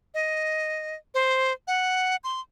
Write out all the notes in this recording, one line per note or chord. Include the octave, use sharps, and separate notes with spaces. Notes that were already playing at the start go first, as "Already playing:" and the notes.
D#5
C5
F#5
C6